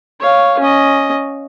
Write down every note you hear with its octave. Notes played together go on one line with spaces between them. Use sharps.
C#5 F5
C#4 D#5